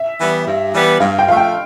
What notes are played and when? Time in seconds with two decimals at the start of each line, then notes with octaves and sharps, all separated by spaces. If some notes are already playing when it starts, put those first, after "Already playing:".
Already playing: E5
0.19 E3 G3 B3
0.46 G2
0.74 E3 G3 B3
1.00 G2 F5
1.19 G5
1.28 F3 A3 F5
1.37 G5